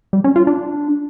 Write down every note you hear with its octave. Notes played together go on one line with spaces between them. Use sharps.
G3
C#4
F4
D4